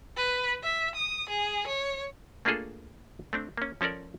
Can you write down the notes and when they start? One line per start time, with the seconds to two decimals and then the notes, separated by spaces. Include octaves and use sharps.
0.17 B4
0.63 E5
0.95 D#6
1.29 G#4
1.67 C#5
2.45 A3 A#3 D4 F4 G#4 A4
3.33 A3 C4 D4
3.58 A#3 C#4
3.81 F3 C#4 A4 A#4 D5